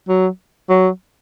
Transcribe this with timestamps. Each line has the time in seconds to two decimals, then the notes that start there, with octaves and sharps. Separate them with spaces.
0.09 F#3
0.69 F#3